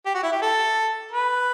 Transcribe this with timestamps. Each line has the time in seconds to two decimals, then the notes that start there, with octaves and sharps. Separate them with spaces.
0.06 G4
0.14 F#4
0.23 E4
0.32 G4
0.42 A4
1.11 B4